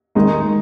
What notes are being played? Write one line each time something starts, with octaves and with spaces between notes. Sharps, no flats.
D#3 G#3 D#4